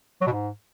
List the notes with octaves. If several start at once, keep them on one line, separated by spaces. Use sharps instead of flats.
F#3
B2
G#2